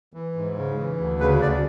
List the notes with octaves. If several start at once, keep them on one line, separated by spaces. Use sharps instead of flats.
E3
G#2
C#3
E3
D2
C#3 B4
D2 D5